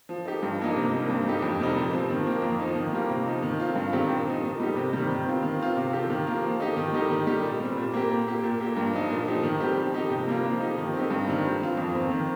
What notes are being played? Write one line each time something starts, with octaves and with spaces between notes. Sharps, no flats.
F3
D#4 G4
G2
F3 A#3 D#4
C3
G3 A#3 D#4
G2
G3 D#4 G4
F2
C3 G3 D#4
A#2
F3 C4
D#3
A#3 F4
F2
F3 D#4
D#3
G3 A#3 F4
C3
F3 D#4
D#3
C4 F4
G2
D#3 C4 G4
A#2
F3 D#4
A#2
G3 D#4 G4
C3
D#3 G3
D#3
C4 F4
D#3
C4 F4
C3
F3 C4 G4
D#3
A#3 F4
F3
D#4 G4
D#3
G3 D#4 G4
D#3
G3 D#4 G4
A#2
G3 C4
A#2
A#3 G4
A#2
A#3 G4
A#2
A#3 G4
G2
F3 D#4
A#2
F3 D#4 G4
D#3
G3 C4 G4
F3
D#4 G4
C3
G3 A#3 F4
F3
D#4 G4
D#3
C4 D#4 G4
G2
D#3 G3
F3
C4 F4
F2
D#3 C4
D#3